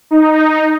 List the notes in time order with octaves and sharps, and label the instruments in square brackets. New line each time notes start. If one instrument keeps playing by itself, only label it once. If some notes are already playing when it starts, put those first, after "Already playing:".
[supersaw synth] D#4